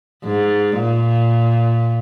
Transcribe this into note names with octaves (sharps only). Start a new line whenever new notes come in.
G#2
A#2